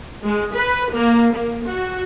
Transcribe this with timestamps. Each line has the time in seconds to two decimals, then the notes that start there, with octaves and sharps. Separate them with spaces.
0.25 G#3
0.55 B4
0.92 A#3
1.33 A#3
1.65 F#4